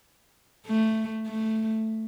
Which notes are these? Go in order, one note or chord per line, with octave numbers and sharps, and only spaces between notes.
A3
A3